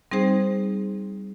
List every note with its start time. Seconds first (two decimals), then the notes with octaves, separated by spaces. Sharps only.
0.11 G3 C4 D#4 G#4 C5